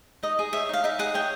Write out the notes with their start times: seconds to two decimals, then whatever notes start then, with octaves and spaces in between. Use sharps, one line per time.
0.23 D#4 D#5
0.39 G#4
0.53 C#5 E5
0.69 D#4 F5
0.84 D#4 E5
0.99 G#4 F#5
1.14 C#5 G5